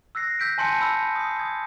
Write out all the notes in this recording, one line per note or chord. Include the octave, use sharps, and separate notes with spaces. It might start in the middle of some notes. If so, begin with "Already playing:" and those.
E6 F#6 A#6 C7
E6 G6 B6 D7
G#5 A5 C6 G6 C#7 D#7
B5 E6
D#6 C7
D#6 G#6